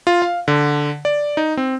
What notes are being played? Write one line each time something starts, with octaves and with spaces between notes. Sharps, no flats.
F4
F5
D3
D5
D#4
C4